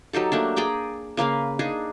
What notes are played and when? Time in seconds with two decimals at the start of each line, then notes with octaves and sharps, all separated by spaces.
0.13 F#3 D#4 G4 A4
0.32 A3 A#3 D4
0.56 G#4 D5 G5 A#5
1.17 C#3 A#3 B4 F5
1.59 D4 D#4 G#4